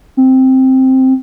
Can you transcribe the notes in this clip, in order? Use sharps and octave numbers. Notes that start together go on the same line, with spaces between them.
C4